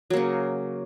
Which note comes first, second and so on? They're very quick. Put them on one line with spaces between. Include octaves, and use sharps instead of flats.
F#3 A#3 C#3